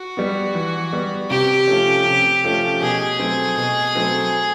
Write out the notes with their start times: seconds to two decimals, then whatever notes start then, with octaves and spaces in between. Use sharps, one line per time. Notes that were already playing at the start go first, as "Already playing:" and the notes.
Already playing: F#4
0.17 G3 B3
0.55 E3
0.93 G3 B3
1.30 C3 G4
1.68 F3 A3 C#4
2.06 C3
2.44 F3 A3 C#4
2.81 B2 G#4
3.19 F#3 A3 C4
3.57 B2
3.95 F#3 A3 C4